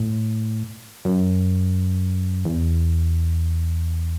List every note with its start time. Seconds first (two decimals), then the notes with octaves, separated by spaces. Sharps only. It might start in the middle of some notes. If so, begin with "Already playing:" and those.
Already playing: A2
1.05 F#2
2.45 E2